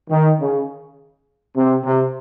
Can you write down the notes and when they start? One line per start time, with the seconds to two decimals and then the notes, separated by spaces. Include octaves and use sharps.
0.10 D#3
0.40 C#3
1.56 C3
1.85 C3